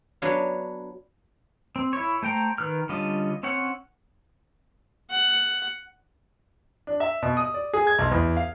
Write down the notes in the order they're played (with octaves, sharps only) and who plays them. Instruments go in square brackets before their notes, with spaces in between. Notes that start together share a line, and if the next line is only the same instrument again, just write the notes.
[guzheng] F#3 B3 D4 C#5 F5
[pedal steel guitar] C4
E4 C#5
A3 C5 G5 A#5
D#3 B4 F6
D3 G3 C#4 F4 D#5
C4 C#4 C#5 F#5
[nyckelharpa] F#5
[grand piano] D4
E5
B2
D#6
D5
G#4
G#6
B1
E2
F5